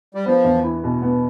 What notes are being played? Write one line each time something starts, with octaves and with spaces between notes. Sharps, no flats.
G3
F3 B3
E2
E4
B2
B3